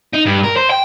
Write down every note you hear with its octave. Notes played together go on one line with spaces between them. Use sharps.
D#4
G2
A#4
C5
G5